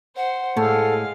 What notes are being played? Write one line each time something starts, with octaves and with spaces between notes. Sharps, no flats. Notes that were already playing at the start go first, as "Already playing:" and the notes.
C5 F#5
A2 G#3 A4 F5